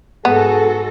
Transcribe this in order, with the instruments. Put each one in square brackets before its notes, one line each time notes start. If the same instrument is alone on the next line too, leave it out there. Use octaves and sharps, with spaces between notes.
[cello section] G#2 F#4 A4 [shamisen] B3 [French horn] G#4